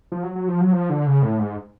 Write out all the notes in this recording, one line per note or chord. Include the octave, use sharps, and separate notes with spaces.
F3
F#3
F#3
F3
F#3
F3
D3
C#3
A2
G#2